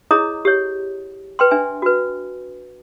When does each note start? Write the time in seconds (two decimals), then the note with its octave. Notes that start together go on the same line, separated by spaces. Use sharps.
0.11 E4 G#4 C#5 D#5 A#5 D#6
0.45 G4 C#5
1.39 B4 G5 C6
1.51 D4 E5 G#5
1.82 F#4 B4